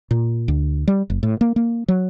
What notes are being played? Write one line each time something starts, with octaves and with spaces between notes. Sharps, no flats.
A#2
D2
G3
F#1
A2
A#3
A#3
F#3